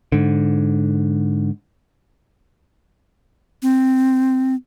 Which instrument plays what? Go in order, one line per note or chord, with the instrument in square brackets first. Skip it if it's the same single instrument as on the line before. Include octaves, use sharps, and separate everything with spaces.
[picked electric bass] G#2 D3
[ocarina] C4